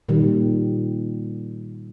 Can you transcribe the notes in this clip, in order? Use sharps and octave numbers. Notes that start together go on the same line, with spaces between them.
A#2 D#3 G3